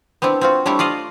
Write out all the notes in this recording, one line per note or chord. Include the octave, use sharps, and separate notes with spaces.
B3 C4 D4 E4
C4 F4 F#4
G3 A3 D4 E4 C#5
F4 D5 D#5 F5